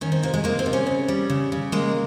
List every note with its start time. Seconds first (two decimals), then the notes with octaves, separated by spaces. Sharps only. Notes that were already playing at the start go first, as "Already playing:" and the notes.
0.01 D#3 C#4
0.12 C4
0.23 C3 A#3
0.34 G#3
0.44 G#3 A#3
0.59 C4
0.66 C3
0.73 C#4
0.87 C#3
1.08 G3
1.30 C#3
1.52 C#3
1.72 G#3 A#3